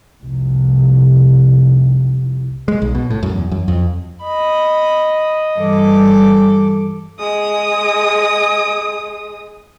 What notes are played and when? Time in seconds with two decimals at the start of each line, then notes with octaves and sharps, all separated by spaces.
0.23 F1 C2
2.68 G#3
2.82 B1
2.95 B2
3.10 A2
3.23 F#2
3.35 E2
3.52 F#2
3.68 F2
4.22 D#5 B5
5.59 G2 E3 A4 D6
7.19 G#3 D#6